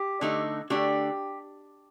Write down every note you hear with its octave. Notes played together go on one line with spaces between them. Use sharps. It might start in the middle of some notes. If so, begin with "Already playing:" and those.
Already playing: G4
D3 A3 D#4
D3 A3 D4 G4